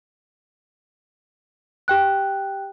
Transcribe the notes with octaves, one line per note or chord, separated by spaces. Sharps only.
G4 G5 F#6